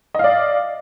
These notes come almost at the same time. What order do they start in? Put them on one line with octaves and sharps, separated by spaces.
D#5 F5 D5